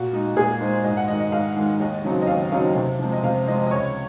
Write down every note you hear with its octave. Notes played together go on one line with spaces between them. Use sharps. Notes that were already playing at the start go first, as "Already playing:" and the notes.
Already playing: A#2 F#4
G#3 D#4
A#2 G#4
G#3 D#4 C5
G#2 D#5
F#5
D#3 G#3 D#5
D#5
G#2 F5
D#3 G#3
D#2 D#5
C#3 F#3 C4 D#4
D#5
D#2 F5
C#3 F#3 C4 D#4 F5
C3
F3 G#3 C4
D#5
C3 F5
F3 G#3 C4 D#5
D#5
C#2 C#5